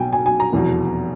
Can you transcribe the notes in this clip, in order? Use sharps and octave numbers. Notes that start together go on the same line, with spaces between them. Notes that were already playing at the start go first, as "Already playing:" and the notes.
Already playing: B1 B2 G5 G#5
G#5
G#5
A#5
F1 E2 B2